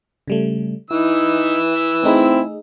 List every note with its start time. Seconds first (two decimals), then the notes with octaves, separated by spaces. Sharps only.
0.28 C#3 G3 A3
0.91 E3 D#4 E4 E6
2.04 A3 C4 D#4 E4 G#4